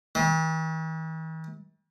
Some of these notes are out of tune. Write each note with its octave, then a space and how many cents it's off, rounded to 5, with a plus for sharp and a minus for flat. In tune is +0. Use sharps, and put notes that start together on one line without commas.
E3 -45